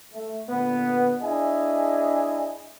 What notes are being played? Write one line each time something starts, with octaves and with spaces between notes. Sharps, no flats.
A3
A#2 D3 B3
D4 E4 G#4 D#5 G#5